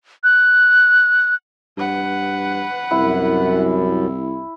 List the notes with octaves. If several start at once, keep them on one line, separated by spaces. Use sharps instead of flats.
F#6
G2 B4 F#5
C2 F#2 E4